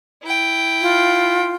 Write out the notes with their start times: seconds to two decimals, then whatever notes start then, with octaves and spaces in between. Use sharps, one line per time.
0.23 E4 G5
0.81 F4